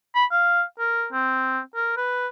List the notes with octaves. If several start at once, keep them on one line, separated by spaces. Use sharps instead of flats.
B5
F5
A#4
C4
A#4
B4